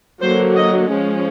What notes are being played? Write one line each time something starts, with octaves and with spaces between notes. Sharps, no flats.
D3 F#3 A#3 C5
D#5
F3 G#3 C#4